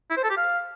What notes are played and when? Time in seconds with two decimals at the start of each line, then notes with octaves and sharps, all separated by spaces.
0.10 E4
0.17 C5
0.24 A4
0.30 G4
0.37 F5